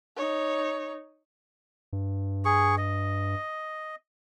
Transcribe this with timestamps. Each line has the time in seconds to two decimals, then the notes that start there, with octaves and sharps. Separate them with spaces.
0.17 D#4 C#5
1.93 G2
2.45 G#4 C#6
2.78 D#5